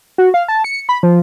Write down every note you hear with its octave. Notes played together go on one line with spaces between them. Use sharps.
F#4
F5
A5
C#7
B5
F3